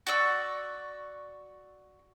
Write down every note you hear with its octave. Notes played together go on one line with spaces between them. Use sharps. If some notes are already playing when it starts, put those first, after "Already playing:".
F#4 D5 C#6 E6